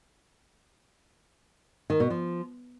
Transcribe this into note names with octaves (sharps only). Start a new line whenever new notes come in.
D#3
B2
F3